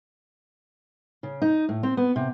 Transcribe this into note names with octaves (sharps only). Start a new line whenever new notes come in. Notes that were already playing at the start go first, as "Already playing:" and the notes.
C#3
D#4
A2
C4
B3
C3